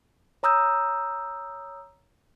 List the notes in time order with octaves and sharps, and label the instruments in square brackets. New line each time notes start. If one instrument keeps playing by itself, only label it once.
[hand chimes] C#5 A#5 D#6 E6 G6